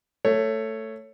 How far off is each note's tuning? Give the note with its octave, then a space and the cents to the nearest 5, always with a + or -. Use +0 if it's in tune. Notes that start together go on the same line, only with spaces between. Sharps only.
A3 +15 C#5 +0